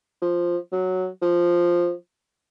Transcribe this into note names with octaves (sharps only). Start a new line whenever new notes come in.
F3
F#3
F3